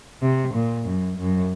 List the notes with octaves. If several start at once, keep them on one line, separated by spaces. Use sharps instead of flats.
C3
A#2
F#2
F#2